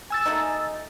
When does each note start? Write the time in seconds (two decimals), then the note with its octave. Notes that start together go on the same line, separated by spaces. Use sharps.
0.10 G#5 E6 A6
0.26 F#3 A3 D#4